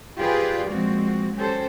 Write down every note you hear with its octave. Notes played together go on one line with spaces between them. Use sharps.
F4 G4 G#4 B4 C5 D5
A#2 F3 G#3 C4 F#4
F#3 C#4 G4 A4 C5